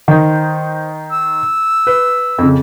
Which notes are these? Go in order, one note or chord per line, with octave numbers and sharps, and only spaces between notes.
D#3 D#4 C5
E6
B4
F2 C#3